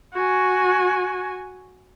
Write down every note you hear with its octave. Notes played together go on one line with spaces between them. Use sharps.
F#4 G#5